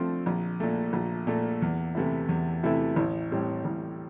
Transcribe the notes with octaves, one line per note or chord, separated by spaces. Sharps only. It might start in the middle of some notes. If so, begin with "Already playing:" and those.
Already playing: D3 F3 A3 C4
A#1
A#2 A3
A#1
A#2 A3
E2
C3 E3 A3 E4
E2
C3 E3 A3 E4
A1
A2 G3 C4
A1